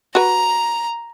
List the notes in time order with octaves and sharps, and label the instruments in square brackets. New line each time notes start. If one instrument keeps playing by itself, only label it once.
[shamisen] F#4 B4 [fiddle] A#5